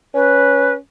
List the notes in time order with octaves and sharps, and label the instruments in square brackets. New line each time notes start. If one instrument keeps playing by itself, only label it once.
[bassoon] C#4 [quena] B4